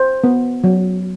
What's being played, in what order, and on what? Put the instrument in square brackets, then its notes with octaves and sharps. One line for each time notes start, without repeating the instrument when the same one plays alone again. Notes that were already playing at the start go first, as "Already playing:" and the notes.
Already playing: [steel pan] C5
B3
F#3